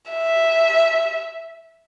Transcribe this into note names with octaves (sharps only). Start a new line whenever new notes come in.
E5